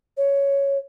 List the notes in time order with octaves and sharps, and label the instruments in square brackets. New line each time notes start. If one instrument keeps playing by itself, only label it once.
[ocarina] C#5